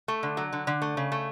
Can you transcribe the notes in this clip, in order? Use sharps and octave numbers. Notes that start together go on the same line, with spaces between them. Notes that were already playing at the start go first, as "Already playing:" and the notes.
A3
D3
F#3
D3
D3
A3
C#3
A3